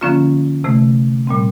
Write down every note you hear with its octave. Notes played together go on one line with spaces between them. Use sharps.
D3 F3 A#3 C#4 F4
C3 E3 A3
A#2 G3 C4